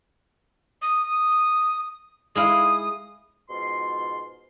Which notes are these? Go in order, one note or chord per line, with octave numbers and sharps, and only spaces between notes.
D#6
G#3 E4 F5 D#6
G#2 B2 F4 C6